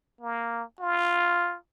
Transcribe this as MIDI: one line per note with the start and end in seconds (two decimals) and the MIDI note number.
0.21 0.63 58
0.80 1.57 65